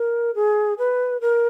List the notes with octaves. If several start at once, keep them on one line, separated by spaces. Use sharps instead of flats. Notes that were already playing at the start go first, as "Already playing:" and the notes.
Already playing: A#4
G#4
B4
A#4